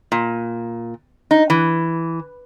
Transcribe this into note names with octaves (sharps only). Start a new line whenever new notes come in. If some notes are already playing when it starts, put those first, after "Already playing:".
A#2
D#4
E3